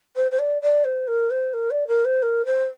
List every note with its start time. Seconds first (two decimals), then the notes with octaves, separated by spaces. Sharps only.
0.16 C5
0.31 C5
0.39 D5
0.62 D5
0.84 C5
1.07 A#4
1.30 C5
1.53 A#4
1.70 D5
1.87 A#4
2.05 C5
2.22 A#4
2.46 C5